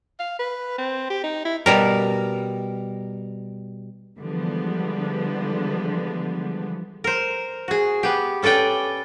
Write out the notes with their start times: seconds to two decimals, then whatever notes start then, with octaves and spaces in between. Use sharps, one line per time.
0.19 F5
0.39 B4
0.78 C4
1.10 G4
1.23 D#4
1.45 E4
1.66 B2 G3 A#4
4.19 D3 E3 F3 G3 G#3 B3
7.04 A#4 C5
7.68 F#4 G#4
8.03 B3 G4
8.42 C#4 A4 B4 D5 G5